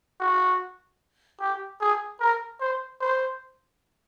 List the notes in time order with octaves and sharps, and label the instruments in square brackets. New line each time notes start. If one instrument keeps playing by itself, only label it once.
[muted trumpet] F#4
G4
G#4
A#4
C5
C5